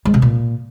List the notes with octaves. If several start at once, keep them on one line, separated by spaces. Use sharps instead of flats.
G#3
C3
A#2